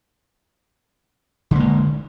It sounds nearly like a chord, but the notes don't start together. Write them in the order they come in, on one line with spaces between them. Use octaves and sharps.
D3 A#3 G#3